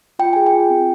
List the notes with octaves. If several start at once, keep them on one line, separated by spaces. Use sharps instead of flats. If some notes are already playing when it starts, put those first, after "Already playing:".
F4 G5
G#4 G#5
G5
F4
C4